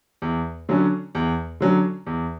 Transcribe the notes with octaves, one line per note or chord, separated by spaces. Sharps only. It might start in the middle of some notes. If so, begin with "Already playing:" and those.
E2
D3 F#3 C#4
E2
D3 F#3 C#4
E2